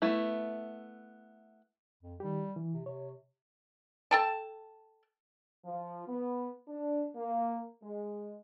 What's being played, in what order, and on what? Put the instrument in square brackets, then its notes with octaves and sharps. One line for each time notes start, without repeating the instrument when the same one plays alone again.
[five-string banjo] A3 B3 E4
[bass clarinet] F2
[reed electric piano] D#3 G4 [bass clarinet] G3
[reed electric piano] E3
[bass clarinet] C3
[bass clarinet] C3 [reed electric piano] C#5
[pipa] A4 G5 A5
[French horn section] F3
B3
D4
A#3
G#3